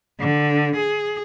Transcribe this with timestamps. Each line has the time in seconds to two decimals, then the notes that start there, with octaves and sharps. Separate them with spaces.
0.20 D3
0.76 G#4